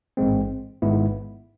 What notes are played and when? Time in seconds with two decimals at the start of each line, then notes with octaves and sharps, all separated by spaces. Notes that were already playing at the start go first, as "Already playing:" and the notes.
0.17 A1 G#2 G#3 C4
0.82 G#1 G#2 G#3 B3 E4